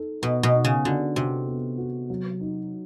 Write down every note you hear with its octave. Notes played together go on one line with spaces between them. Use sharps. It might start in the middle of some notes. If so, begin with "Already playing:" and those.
Already playing: D#4 A4
B2 B3
B2
D#4
C#3
D3 F#4
C3 F#4
B3
F#4
F#3
D#4